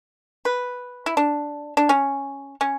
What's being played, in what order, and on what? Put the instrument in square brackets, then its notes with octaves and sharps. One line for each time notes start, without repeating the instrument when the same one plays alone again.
[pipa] B4
E4
D4
D4
C#4
C#4